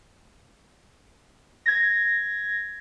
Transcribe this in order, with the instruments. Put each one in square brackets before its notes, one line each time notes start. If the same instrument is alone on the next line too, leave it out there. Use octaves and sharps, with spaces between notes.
[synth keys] G#6 A#6